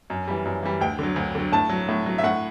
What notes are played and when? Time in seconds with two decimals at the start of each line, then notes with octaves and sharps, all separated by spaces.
0.10 F#2
0.28 E3 G3
0.45 F#2
0.63 E3 G3
0.81 D2 G5
0.99 D3 F#3
1.16 D2
1.35 D3 F#3
1.52 A2 A5
1.69 F#3
1.89 A2
2.06 F#3
2.18 E5
2.24 A2 F#5